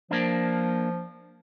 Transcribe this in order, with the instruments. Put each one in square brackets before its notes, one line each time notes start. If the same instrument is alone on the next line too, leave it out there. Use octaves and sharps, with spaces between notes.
[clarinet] F3 [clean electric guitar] A#3 D4